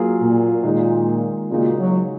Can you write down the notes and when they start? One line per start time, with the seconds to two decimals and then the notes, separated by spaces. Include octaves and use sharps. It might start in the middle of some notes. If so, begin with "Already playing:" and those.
Already playing: F#3 A#3 F4 G#4
0.21 A#2
0.63 A#2 D#3 G#3 D#4
1.50 A#2 C#3 G#3 D#4 F#4
1.79 F#3